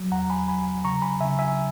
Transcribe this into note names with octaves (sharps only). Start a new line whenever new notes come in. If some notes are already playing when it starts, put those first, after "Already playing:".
Already playing: F#3
E2 F#5 A#5
G#5 B5
F#3 G#5 B5
C#3 A#5 C#6
G#5 B5
C#3 E5 G#5
E5 G#5